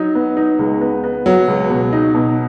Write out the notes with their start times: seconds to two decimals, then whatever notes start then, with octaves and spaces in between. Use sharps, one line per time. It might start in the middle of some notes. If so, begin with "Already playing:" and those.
Already playing: F#3 D#4
0.15 B3
0.37 D#4
0.59 C#2
0.81 B3
1.04 B3
1.26 F#3 B3
1.48 C#2
1.70 B2
1.93 D#4
2.15 B2